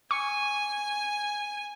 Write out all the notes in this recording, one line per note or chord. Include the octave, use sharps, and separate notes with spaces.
G#5 C#6